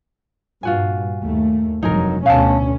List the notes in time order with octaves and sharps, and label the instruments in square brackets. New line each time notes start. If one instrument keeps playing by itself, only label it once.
[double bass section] G2 A#2 [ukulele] F4 F#4 G#5
[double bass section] D#2 A3
[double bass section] F1 G2 F#3 [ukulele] D#4 G#4 A#4
[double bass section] D2 B2 C#4 [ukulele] F5 A5